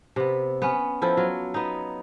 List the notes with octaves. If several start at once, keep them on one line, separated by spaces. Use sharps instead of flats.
C3 B3
B3 C#4
F3 E4 A4 G5
F#3 F4
B3 D#4